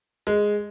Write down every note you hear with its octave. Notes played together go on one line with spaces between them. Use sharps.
G#3